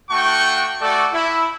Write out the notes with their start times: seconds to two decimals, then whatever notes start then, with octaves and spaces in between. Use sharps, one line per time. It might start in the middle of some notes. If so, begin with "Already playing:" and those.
0.10 A3 D4 F#4 F#5 G5 C#6
0.81 A3 F#4 A4 D5
1.12 E4